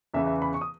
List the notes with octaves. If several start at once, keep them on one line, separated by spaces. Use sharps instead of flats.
E2 C#3 E3 B3 E5
E5
B5
C#6
D#6